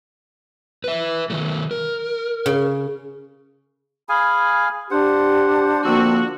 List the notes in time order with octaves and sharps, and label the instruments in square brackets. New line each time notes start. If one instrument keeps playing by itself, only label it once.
[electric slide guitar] B4 E5
D#3 F#3 A3
A#4
[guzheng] C#3
[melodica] G#4 F5 G#5 [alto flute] B5
[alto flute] D4 [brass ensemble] G4 [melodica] C5 F#5
[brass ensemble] D3 F3 A#3 [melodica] C4 E6 [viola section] F#4